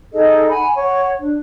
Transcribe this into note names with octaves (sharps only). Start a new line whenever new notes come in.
D#4 G#4 A4 D#5
F#5 G#5 B5
C#5 F#5 C#6
D4